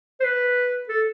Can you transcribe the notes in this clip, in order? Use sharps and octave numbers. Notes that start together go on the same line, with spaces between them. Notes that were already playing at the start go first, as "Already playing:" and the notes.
C5
B4
A4